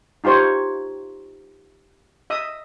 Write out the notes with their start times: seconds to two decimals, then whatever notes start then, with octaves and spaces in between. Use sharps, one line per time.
0.24 D#4 F4 G4 C5 C#5
2.30 D#5 E5 D#6